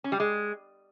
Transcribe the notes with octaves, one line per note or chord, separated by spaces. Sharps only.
C#4
G3
G#3